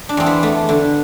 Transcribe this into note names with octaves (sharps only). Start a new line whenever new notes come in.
D4
E2 C4
B3
A3
D3